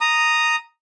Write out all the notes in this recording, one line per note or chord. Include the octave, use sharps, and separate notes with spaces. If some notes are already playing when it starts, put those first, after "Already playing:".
A#5 D#6